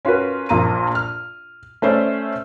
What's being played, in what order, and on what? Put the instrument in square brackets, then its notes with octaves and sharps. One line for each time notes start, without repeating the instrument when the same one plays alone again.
[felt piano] C#4 F4 F#4 A#4 B4
A#1 A#2 A#5 D#7
F6
A3 C#4 C5 D5 E5